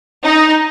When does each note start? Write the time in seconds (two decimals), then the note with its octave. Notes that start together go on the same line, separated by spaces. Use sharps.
0.24 D#4